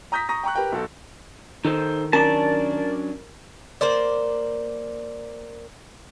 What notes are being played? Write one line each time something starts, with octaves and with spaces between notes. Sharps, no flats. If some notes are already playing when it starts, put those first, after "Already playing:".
A#5 D#6 G6 A#6 B6
A#5 C#6 D#6 A#6
G5 A#5 C#6 F#6
G4 A#4 B4 G5
B1 F#4 A4
D#3 D#4 A4 C5
F#3 C#4 D4 A#4 D5 A5
A#3 C5 D5